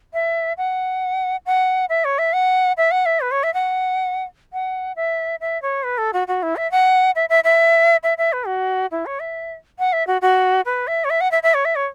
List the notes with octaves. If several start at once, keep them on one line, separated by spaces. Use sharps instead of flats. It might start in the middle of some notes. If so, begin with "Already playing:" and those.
E5
F#5
F#5
E5
C#5
E5
F#5
E5
F#5
E5
B4
C#5
E5
F#5
F#5
E5
E5
C#5
B4
A4
F#4
F#4
E4
E5
F#5
E5
E5
E5
E5
E5
B4
F#4
E4
C#5
E5
F#5
E5
F#4
F#4
B4
E5
C#5
E5
F#5
E5
E5
C#5
E5
C#5